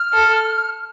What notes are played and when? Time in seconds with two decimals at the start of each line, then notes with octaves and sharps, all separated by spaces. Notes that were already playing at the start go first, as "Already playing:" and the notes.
Already playing: F6
0.14 A4